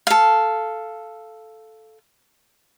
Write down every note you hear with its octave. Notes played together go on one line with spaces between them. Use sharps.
A4 F5